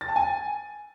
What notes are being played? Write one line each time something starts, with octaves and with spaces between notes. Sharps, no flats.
A6
A5
G#5